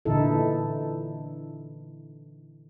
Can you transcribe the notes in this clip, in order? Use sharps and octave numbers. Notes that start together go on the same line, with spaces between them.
A#2 D3 E3 D#4 E4 A4